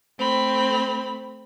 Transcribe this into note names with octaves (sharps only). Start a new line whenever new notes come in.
A3 C4 B5